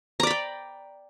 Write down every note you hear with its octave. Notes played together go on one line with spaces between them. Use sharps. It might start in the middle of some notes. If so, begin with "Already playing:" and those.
D5 G5 A#5 B5